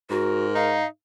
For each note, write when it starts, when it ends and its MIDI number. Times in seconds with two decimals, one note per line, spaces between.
0.10 0.84 44
0.10 0.47 66
0.10 0.73 70
0.55 0.85 63
0.55 0.86 77